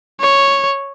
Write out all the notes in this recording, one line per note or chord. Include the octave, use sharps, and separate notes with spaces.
C#5